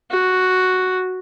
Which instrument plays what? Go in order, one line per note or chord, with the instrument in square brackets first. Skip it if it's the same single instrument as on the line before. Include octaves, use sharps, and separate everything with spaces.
[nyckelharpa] F#4